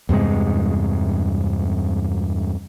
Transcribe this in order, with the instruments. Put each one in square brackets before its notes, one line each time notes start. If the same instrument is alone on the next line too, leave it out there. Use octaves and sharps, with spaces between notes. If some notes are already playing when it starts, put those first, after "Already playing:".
[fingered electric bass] E2 G2 C3 G#3